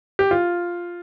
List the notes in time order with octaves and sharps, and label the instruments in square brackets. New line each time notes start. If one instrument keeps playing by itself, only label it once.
[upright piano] G4
F4